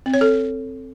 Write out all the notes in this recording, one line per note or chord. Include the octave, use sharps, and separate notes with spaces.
C4
C#5
A4